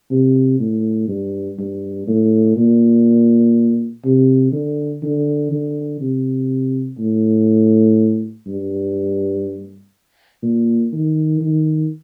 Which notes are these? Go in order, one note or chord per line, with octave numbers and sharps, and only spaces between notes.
C3
A2
G2
G2
A2
A#2
C3
D3
D3
D3
C3
A2
G2
A#2
D#3
D#3